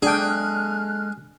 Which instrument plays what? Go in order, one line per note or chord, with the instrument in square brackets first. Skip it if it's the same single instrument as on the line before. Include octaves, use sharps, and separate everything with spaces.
[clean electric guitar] G#3 A4 [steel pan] D4 G5 [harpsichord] G#4 [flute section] F6 F#6